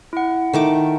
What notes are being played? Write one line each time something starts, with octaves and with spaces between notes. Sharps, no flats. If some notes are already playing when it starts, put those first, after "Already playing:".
E4 F#5
D#3 A3 D6